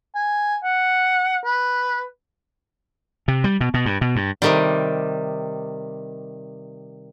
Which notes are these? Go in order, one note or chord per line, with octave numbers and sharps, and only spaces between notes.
G#5
F#5
B4
C3
G3
B2
B2
G2
B2
G2
C3 D#3 G3